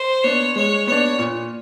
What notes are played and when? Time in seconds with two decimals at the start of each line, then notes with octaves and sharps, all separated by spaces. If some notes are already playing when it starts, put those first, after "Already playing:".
Already playing: C5
0.24 B3 D4 C#5
0.56 G#3 C#5
0.87 B3 D4 C#5
1.18 A#2